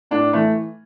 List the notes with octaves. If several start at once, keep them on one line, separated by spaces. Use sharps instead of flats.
A2 D4
E3 A3